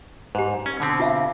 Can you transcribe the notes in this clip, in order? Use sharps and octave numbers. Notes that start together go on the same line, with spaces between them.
G#2 G4 C5
C#4
B2 D3 C4
F4 E5 F5